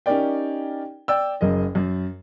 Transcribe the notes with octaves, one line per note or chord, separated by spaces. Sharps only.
C#4 D#4 G4 A#4 D5 G5
D5 G5 E6
F#1 F#2 A#4 D#5
F#2